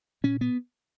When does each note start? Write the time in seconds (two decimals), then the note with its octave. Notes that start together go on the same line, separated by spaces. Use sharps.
0.24 A#2 C#4
0.41 B3